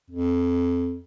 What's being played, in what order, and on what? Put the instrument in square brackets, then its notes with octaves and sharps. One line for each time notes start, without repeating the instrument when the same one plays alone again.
[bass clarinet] F2